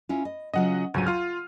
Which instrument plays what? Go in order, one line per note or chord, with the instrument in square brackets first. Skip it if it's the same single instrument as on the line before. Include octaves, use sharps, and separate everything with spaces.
[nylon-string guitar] C#4 E4 F4
D#5
[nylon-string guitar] C#3 F#3 F4 [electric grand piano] D#5 F#5
[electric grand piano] C#2 F#3 D#7 [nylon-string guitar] G#2 D3
[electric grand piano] F4 F6 [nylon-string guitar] F#5